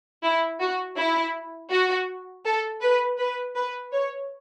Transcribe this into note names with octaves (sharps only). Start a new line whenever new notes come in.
E4
F#4
E4
F#4
A4
B4
B4
B4
C#5